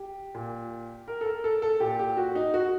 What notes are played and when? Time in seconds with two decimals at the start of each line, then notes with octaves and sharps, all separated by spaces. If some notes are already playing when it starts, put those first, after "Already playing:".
Already playing: G4
0.35 A#2
1.08 A#4
1.21 A4
1.26 A#4
1.44 A4
1.62 A4
1.80 A#2 G4
1.99 G4
2.17 F#4
2.35 D#4
2.54 F#4